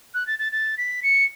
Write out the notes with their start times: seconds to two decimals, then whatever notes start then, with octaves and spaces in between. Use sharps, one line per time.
0.14 F#6
0.27 A6
0.39 A6
0.52 A6
0.78 B6
1.03 C#7